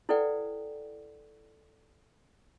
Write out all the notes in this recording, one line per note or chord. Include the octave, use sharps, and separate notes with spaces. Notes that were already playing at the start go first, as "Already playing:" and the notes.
E4 A4 B4 D5 F#5 G5